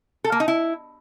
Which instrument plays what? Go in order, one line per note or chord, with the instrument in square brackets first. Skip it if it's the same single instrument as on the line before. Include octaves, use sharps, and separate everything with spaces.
[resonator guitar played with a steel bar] A4
A#3
D#4
E4